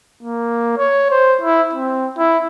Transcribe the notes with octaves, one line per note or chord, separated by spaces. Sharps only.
A#3
C#5
C5
E4
C4
E4